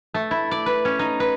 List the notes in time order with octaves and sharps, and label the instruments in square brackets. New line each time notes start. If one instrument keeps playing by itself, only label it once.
[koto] A3
E4
D5
B4
C#4
D#4
B4